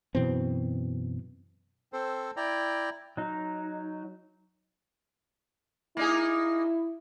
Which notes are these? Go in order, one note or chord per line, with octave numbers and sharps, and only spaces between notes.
F#2 B2 E3 C4
C4 A4 C5
E4 D5 G5 A#5
F#3 D#4
A#3 D#4 E4 G#4